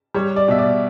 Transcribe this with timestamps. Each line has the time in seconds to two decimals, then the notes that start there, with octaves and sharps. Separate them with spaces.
0.14 G3 C#5
0.36 D5
0.48 B2 E5
0.59 D5